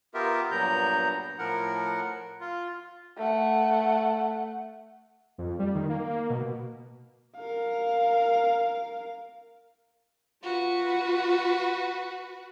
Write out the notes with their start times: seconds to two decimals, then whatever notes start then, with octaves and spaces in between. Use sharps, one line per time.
0.14 B3 F4 G4 A#4 E5
0.51 G2 A#2 F#3 B3 A#5 G6
1.38 A2 F3 A#4 F#5
2.41 F4
3.18 A3 F#5
5.38 F2
5.59 G3
5.75 D#3
5.89 A#3
6.09 A#3
6.30 B2
7.36 A#4 F5
10.43 F4 F#4 B4